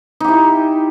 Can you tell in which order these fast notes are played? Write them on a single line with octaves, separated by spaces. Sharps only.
D#4 G4 E4